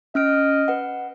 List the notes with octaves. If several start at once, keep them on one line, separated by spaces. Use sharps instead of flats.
C#4 D#5 F6 D7
B4 F#5